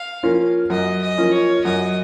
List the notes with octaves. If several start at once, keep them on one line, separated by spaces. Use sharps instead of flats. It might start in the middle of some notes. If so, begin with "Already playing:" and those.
Already playing: F5
F3 A#3 C#4 F4
F#2 D#5
D#5
F3 A#3 C#4 F4
C#5
F#2 D#5